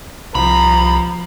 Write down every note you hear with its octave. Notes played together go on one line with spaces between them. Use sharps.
C2 F3 A#5 B5